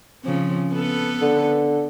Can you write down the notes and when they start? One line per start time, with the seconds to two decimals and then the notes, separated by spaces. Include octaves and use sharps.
0.23 C#3 F3 C4
0.72 B3 A4 B4
1.22 D3